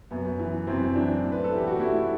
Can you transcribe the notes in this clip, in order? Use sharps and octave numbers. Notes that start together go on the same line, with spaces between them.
F#2 B3
E3
F#2 C4
E3 D4
A2
B4
A4
E3 G4
F#4
A2 E4